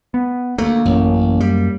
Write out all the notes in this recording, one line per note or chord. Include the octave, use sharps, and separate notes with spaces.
B3
D2 A3 A#3
A1 F#2
G3